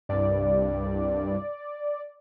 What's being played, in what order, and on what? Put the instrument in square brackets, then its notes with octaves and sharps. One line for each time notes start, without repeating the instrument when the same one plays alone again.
[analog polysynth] C2 G2 [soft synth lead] D5